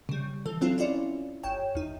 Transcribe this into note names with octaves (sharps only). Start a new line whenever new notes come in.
C#3 G3
E3 A4
F#3 C4 E4 F4
C#4 E4 F4 D5
G1 C#5 G5 E7
E2 D#4